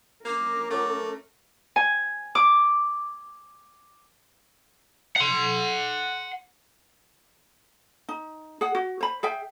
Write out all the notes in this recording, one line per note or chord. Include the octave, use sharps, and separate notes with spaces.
A#3 C#4 A#4 D6
A3 A4 C#5 F#5 D6
G#5
D6
F#5 C6
D#4
G#4 F#5
F#4
C5 B5
G#4 E5 G5